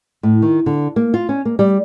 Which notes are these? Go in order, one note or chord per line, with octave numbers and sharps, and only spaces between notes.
A2
D#3
D3
A#3
F4
C#4
A#3
G3